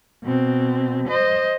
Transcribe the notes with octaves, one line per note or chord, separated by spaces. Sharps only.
B2 C4
C5 D#5